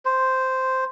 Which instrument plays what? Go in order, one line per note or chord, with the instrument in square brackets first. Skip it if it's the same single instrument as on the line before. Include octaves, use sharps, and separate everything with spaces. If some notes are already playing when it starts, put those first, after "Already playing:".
[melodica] C5